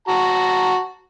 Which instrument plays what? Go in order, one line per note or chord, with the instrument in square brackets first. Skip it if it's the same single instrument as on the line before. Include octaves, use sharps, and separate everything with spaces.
[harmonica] F#4 A5 A#5